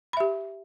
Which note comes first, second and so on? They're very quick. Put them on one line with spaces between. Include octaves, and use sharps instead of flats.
B5 E5 G4